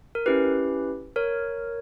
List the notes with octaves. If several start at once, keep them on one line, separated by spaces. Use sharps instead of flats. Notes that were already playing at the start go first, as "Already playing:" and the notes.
A#4
C#4 E4 G4 B4
A#4 C#5